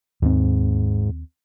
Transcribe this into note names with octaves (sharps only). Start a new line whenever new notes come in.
D#2 G#2 C4